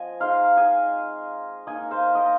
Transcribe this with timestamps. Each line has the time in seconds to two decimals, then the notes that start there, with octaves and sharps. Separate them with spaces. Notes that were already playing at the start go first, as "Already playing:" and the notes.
Already playing: F3 C4 D#5 G#5
0.20 G#3 D#4 C5 F5
0.57 D#5 G#5
1.67 A#3 D#4 D#5 G#5
1.91 C5 F5
2.15 A#4 D#5